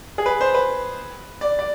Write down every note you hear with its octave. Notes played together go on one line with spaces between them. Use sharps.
G#4
B4
C5
B4
D5
D5